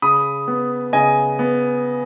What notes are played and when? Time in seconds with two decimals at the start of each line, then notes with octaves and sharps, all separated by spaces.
0.02 C#3 B5 D#6
0.48 B3
0.93 C#3 D#5 G#5
1.39 B3